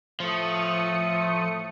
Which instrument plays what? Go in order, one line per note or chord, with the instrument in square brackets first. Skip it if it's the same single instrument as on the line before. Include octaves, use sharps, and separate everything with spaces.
[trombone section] A2 A3 [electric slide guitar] F3 [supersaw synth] D#6 C#7